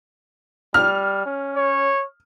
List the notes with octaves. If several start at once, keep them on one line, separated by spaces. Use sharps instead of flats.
G3 F6
C#4
C#5